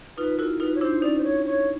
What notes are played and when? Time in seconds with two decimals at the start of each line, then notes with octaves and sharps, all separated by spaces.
0.17 D#4 F4 B4
0.39 E4 F#4 A#4
0.60 D#4 F4 B4
0.75 C#5
0.81 D4 E4 C5
1.02 C#4 D#4 D5
1.18 C5
1.24 C#5
1.46 C#5